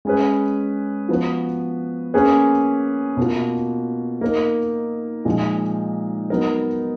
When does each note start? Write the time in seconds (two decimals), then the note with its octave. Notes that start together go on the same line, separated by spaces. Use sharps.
0.05 G#3 C#4 G#4 B4
1.09 F3 B3 F#4 B4
2.14 A#3 C#4 G#4 B4
3.17 B2 A#3 F4
4.21 A#3 D#4 A#4
5.25 A#2 F3 G#3 D#4
6.30 F#3 B3 D#4 A#4